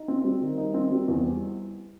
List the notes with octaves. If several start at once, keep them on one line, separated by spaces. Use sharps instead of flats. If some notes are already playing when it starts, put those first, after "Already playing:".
Already playing: D#4
C4
G3
D#3
D#4
C4
G3
E2